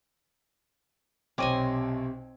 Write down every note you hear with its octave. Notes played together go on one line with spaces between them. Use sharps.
B1 C3 C4 C#5 D#5 G#5 D6